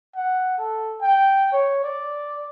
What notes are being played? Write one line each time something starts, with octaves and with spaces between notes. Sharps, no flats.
F#5
A4
G5
C#5
D5